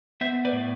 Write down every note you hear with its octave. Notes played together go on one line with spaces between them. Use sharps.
B3 C5 E5
B4 D5
A2